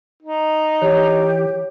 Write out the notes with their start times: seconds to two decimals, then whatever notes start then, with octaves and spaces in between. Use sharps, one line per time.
0.22 D#4
0.82 E3 G4 C#5